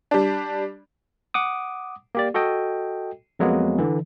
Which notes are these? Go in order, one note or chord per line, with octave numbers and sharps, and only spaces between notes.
G3 D4
F#5 D6 D#6
A#3 G4 D5
F#4 A4 D#5 G5
F2 F#3 G#3 A#3 B3
D3 E3